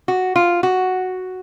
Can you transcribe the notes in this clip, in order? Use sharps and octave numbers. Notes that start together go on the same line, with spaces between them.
F#4
F4
F#4